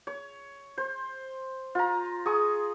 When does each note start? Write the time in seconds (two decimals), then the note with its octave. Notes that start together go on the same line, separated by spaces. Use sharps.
0.07 C#5
0.78 C5
1.75 F4 A#5
2.26 G#4 C#6 D#6